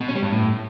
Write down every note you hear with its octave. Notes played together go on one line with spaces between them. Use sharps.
B2
C#4
G3
G2
A2